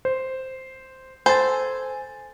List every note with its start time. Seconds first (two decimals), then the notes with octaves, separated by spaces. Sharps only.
0.05 C5
1.26 A4 C5 G#5 A6